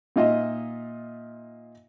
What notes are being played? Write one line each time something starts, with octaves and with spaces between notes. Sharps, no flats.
A#2 D#4 F4 D#5 E5